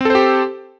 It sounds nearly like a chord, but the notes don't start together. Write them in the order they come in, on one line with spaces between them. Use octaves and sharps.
C4 A4 C5 G4